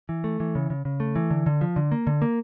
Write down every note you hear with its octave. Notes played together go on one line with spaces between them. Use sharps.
E3
A3
E3
C#3
C#3
C#3
A3
E3
D3
D3
F3
D3
A#3
D3
A#3